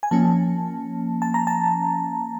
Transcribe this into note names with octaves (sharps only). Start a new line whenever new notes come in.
G#5
F3 A#3 C#4 A5
A5
A#5
A5